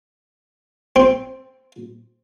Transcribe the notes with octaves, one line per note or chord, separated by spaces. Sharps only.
C4